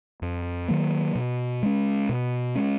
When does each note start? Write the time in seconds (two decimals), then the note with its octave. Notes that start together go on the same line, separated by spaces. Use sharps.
0.22 F2
0.68 D#3 F#3 A#3
1.15 B2
1.63 G#3 C#4
2.09 B2
2.55 G#3 C#4